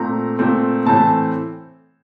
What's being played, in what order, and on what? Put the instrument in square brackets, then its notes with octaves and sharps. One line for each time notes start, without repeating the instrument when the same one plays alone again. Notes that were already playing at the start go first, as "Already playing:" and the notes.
Already playing: [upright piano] A#2 A3 C4 A#5
A#2 A3 C4
A2 E3 A3 C4 A5